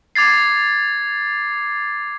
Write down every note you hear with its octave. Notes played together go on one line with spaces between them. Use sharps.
D6 G#6 A6 C7